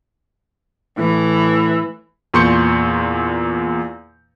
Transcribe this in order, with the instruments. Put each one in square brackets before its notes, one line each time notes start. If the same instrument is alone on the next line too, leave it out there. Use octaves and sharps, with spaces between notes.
[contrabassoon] A2 [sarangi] E3
[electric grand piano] E2 A#2 C6 C#6 G6 C#7